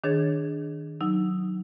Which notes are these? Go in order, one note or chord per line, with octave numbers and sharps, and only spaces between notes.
D#3 D4 G#4 C#5 G#6 A6
F#3 D#4 E6